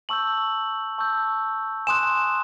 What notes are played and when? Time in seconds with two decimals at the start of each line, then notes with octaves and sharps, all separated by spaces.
0.09 A5 C#6 E6 G6 F#7
0.98 A5 C#6 E6 G6
1.87 G#5 C6 D#6 F#6 E7